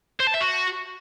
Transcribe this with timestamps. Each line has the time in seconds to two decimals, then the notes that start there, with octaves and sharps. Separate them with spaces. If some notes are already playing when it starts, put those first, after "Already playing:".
0.20 C5
0.27 A5
0.34 E5
0.41 F#4